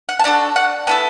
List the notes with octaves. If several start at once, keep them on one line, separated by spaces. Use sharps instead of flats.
F#5
A5
D4 F#4 A4 F#5
F#5
B3 E4 A4 A5